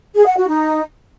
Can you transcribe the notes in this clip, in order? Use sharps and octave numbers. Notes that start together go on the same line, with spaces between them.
G#4
F#5
F#4
D#4